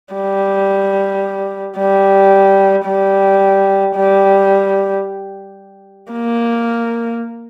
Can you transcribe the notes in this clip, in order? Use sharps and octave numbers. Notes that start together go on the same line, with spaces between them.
G3
G3
G3
G3
A#3